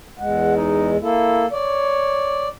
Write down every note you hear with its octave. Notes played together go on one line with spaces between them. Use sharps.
E2 G#3 F#5
D#4
A#3 E4 A4
C#5 D5